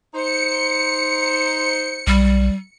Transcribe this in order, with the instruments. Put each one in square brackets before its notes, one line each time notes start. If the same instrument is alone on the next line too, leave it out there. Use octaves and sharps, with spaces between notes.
[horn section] D#4 C5 [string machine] C#7
[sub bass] B1 [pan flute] G3